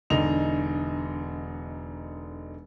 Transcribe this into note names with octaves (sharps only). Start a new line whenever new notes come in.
E1 D3 D#4 F7